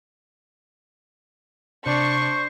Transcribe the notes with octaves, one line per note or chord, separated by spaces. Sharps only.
C3 D4 C5 C#6